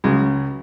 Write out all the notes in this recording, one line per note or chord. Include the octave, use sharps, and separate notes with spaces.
C#2 C#3 F#3 G#3